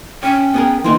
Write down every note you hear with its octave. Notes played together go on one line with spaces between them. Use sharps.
C#4 C#5 G5
B3 G#4 A#4
D3 E3 A#3 D#4 C6